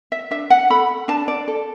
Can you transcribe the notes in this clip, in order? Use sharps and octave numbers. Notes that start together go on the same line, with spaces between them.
E5
D4 E5
F#5
A4 B5
D4 A5
D5
A4